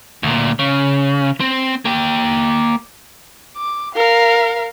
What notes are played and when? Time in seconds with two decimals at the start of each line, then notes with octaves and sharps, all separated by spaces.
0.23 D2 A#2
0.59 C#3
1.40 C4
1.85 A#3 G5
3.57 D6
3.95 A#4 F5